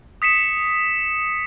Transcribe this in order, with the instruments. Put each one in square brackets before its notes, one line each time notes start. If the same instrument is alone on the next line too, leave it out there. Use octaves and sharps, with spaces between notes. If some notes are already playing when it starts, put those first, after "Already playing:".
[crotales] D#6 B6 C#7 E7